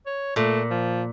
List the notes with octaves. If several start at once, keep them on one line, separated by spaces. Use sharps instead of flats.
C#5
A#2 A3
F3